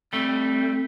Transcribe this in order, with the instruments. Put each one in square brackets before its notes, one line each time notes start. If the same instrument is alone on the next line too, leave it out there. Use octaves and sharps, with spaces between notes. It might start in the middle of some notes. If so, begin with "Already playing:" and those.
[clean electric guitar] G3 A3 [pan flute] C4